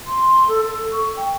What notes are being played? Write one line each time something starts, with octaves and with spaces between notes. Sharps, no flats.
C6
A4
A4
C#6
G5